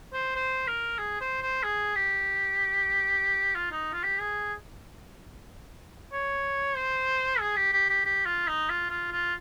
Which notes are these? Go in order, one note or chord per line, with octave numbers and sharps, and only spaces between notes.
C5
C5
A#4
G#4
C5
C5
G#4
G4
F4
D#4
F4
G4
G#4
C#5
C5
G#4
G4
G4
G4
G4
F4
D#4
F4
F4
F4